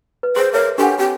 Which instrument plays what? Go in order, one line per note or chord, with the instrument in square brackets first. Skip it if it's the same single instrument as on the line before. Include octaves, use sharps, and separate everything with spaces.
[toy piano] B4
[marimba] G#4 [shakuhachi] C5 [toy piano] C6
[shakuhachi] A#4 [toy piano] C#5 E5 D6
[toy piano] D4 A4 C6 [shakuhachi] G4 [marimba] F#5 G#5 C#6
[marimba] C4 [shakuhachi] G4